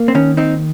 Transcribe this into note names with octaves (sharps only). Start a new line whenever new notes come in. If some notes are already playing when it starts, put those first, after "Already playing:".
Already playing: A#3
C4
D#3 C#4
C4 D#4